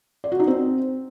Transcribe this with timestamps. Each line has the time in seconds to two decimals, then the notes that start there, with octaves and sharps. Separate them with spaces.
0.24 D5
0.32 F#4
0.40 D#4
0.47 C4